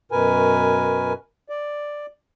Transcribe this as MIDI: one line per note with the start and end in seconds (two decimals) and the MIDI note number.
0.12 1.13 42
0.12 1.13 47
0.12 1.13 70
0.12 1.13 71
0.12 1.13 80
1.49 2.06 74